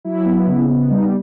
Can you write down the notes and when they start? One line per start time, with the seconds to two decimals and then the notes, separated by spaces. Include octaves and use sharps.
0.05 F#3 E4
0.26 B3
0.47 C#3
0.69 B3
0.90 G3 D#4